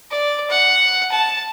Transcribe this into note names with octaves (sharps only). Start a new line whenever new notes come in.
D5
F#5
A5